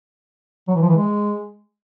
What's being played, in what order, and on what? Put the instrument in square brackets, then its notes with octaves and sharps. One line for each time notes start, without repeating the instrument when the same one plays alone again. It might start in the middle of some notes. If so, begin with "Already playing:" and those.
[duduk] F#3
E3
F3
E3
G#3